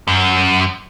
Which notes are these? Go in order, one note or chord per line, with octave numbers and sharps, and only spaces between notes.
F#2